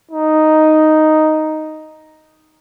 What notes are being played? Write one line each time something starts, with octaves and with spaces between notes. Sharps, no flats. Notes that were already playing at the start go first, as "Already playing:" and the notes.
D#4